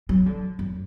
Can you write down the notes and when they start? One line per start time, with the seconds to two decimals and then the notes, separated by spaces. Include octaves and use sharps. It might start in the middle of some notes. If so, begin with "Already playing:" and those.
0.09 F#3
0.26 D3
0.59 F#2